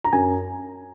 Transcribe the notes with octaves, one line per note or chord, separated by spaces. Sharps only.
A#5
F#2 G#5